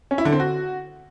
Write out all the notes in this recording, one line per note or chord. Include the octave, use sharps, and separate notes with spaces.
C#4
E4
D3
C4
F#4